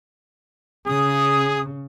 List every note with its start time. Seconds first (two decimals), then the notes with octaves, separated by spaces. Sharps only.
0.87 C#3 G#4 D#6